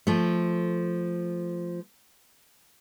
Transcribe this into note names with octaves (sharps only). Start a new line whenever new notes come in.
F3 A3